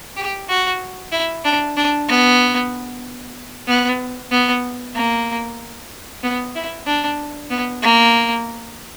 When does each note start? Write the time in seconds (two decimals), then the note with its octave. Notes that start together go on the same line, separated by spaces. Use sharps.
0.17 G4
0.49 F#4
1.12 E4
1.45 D4
1.77 D4
2.09 B3
3.68 B3
4.31 B3
4.95 A#3
6.23 B3
6.56 E4
6.87 D4
7.51 B3
7.83 A#3